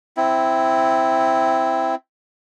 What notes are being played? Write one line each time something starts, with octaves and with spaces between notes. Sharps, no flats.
C4 E4